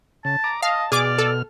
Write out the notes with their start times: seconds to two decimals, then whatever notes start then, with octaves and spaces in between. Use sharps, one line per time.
0.25 C#3 A5
0.44 A#5 D6
0.62 D#5 F5 A5
0.92 B2 G#4 D5 D6 F6
1.18 A4